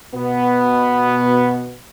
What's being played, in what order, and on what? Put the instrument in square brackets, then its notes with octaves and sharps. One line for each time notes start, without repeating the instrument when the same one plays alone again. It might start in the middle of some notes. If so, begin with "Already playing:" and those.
[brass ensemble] B2 B3